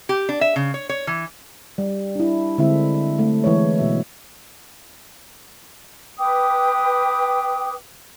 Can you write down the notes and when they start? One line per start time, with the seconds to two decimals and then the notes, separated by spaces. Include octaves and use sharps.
0.09 G4
0.29 D4
0.41 E5
0.56 C#3
0.74 C#5
0.89 C#5
1.07 E3
1.78 G3
2.15 D4 E4
2.58 D3 G#3 C4 E4 E5
3.19 A3
3.44 E3 G#3 C#5
3.79 B2 F#4 E5
6.19 B4 G5 D6 D#6